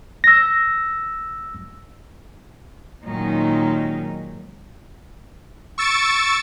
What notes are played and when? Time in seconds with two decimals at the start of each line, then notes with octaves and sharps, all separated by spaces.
0.24 E6 A#6
3.04 A#2 D#3 F#3 G#3 C#4 D#4
5.78 C#6 E6 A6 C#7 D7